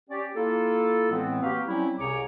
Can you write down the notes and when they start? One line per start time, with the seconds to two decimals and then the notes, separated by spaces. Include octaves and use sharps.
0.10 C#4 G4 D5
0.34 A#3 E4 F4 A4
1.11 A2 E3 G#3 B3 C4
1.42 A#3 C4 F#4 G4 B4 F5
1.66 F#3 G3 C4 C#4 E4
1.98 C2 C3 G#4 C#5 A#5 D6